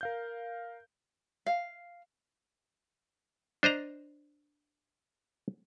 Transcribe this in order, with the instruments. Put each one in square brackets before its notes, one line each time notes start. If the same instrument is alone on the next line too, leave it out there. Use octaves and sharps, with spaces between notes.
[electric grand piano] A#4 F5 G6
[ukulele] F5
[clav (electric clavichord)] D4 C5 D#5 A#5